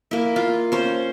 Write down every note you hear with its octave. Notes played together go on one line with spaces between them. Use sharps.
A#3 E4
F4
C#4 C5